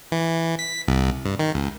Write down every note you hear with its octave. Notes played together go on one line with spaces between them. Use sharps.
E3
B6
C2
G2
D#3
C#2